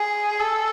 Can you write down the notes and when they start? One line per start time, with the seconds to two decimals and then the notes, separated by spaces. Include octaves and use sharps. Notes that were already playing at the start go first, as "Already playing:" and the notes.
Already playing: G#4
0.39 A4